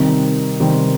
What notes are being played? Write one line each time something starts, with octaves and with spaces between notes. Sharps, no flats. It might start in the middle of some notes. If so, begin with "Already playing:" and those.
Already playing: C3 D#3 G3 C4 D#4
C3 D#3 G3 C4 D#4